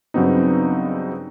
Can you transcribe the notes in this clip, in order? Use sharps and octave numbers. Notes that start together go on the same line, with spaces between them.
G2 C#3 F#3 B3 C4 D#4